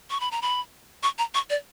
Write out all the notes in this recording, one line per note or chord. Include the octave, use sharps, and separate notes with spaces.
C#6
B5
A#5
B5
C#6
A#5
C#6
D5